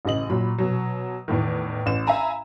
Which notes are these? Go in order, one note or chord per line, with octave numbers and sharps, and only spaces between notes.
A1 C#3 D#5 F#7
A#2 F#3 B5
B2 F#3
E2 A2 D#3
A1 E7
E5 F5 G#5 A#5 B5